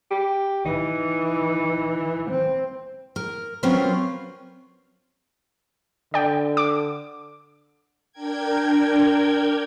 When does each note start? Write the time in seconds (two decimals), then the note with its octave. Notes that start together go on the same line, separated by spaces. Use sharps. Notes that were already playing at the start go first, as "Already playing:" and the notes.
0.11 G4
0.65 E3 D#4
2.31 C4
3.16 A#4
3.63 F#3 C4 C#4 F4 A#4 B4
6.14 D3 D5 G5
6.57 D6
8.12 D4 A#4 G5 G#6